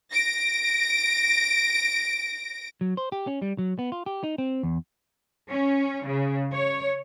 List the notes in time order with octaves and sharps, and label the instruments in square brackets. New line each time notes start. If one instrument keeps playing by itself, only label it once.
[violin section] A#6 D7
[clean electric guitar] F#3
C5
G4
C#4
G3
F#3
B3
F4
G4
D#4
C4
E2
[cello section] C#4
C#3
C#5